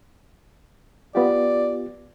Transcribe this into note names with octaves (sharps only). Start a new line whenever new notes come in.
B3 F4 G4 D5